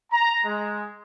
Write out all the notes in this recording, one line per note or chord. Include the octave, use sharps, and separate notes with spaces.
A#5
G#3